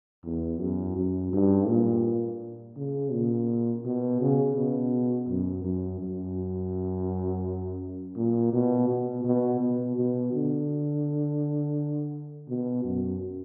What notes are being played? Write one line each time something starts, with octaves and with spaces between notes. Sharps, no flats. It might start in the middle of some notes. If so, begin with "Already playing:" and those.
E2
F#2
F#2
G2
A#2
C#3
A#2
B2
C#3
B2
F#2
F#2
F#2
A#2
B2
B2
B2
B2
B2
D3
B2
F#2